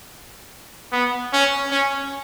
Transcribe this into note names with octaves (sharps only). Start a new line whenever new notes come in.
B3
C#4
C#4